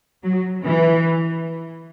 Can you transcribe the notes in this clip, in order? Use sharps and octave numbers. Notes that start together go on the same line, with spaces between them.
F#3
E3